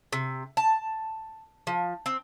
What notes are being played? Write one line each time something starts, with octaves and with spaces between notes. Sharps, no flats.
C3
A5
F3
C4